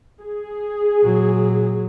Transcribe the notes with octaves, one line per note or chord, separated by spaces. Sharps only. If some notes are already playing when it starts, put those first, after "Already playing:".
G#4
A#2 F#3